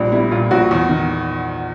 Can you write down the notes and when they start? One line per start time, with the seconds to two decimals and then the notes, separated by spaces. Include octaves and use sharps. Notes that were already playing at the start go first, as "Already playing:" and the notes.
Already playing: A#1 G3 D4
0.12 G3 E4
0.31 A#2 F4
0.51 A#1 F#4
0.71 E2
0.89 D#3